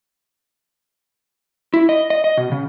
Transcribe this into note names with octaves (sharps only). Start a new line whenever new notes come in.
E4
D#5
D#5
D#5
B2
C#3